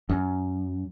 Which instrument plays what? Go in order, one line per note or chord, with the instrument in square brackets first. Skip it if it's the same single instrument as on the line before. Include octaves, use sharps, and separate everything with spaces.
[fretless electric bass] F#2